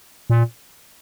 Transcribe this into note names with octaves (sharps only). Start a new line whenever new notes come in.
A#2